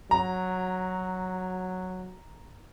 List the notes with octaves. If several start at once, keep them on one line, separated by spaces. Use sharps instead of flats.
F#3 A#5